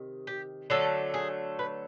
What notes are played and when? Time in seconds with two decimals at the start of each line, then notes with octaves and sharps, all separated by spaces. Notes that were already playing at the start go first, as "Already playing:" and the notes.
Already playing: C3 D#3
0.27 G4
0.70 D3 F#3 A3 A4
1.14 G#4
1.59 B4